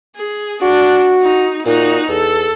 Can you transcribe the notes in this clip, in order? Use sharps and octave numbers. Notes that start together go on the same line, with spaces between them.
G#4
D4 F#4
D#4
A#2 D#4 F#4
E2 A4